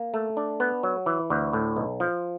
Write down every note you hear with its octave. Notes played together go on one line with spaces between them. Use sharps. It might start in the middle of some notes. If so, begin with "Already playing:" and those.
Already playing: A#3
A3
D4
B3
F#3
E3
D2
A2
B1
F3